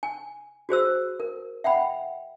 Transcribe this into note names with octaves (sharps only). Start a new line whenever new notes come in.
G#5
F#4 G#4 C5 E6
A#4
E5 F#5 G5 B5